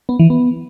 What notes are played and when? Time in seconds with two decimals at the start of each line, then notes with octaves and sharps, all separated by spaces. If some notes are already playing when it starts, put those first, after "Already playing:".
0.09 B3
0.19 E3
0.30 B3